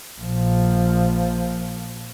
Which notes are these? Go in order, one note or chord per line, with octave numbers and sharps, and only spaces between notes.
A#1 F3